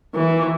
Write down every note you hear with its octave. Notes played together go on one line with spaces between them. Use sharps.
E3